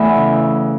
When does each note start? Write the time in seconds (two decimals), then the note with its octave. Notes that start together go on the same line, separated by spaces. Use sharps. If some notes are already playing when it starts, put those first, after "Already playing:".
Already playing: E2 E3 A3 E5
0.16 C#3